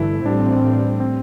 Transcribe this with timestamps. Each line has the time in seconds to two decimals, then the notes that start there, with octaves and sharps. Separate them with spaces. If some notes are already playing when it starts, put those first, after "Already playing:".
Already playing: G1 G2 E3 A3 E4
0.26 A1 A2 G3 C4 D4
1.00 C4